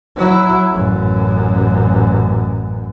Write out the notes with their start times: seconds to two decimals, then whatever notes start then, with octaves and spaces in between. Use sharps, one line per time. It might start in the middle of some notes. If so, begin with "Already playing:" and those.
0.16 F#3 E4
0.72 A1 F#2